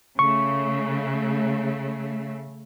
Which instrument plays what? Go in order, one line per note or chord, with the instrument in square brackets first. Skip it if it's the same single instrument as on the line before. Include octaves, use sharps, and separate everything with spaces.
[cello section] C#3 A3 [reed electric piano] C#6